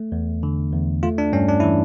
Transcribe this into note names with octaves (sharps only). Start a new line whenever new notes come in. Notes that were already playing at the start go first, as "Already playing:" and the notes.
Already playing: A3
E2
D3
E2
A3 F4
D4
G2 C#4
D4
E3 E4